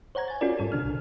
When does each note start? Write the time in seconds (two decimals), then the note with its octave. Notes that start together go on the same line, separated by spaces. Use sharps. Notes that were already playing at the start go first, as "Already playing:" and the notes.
0.15 C5 C#5 F#5 A#5 G#6
0.28 G#5 A6
0.41 C#4 F4 F#4 G#4 A#4 D5
0.59 G#2 G3 A4
0.72 B2 D3 D4 F6
0.85 C2